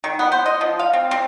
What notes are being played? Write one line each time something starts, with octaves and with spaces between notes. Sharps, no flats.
D#3
B3
C5
D#5
F3
F5
C4
C4